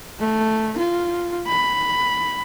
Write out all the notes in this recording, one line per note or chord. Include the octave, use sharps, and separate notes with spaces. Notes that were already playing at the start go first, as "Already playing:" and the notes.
A3
F4
B5